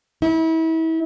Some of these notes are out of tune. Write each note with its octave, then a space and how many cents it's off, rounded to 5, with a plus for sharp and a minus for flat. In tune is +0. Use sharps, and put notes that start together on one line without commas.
E4 -35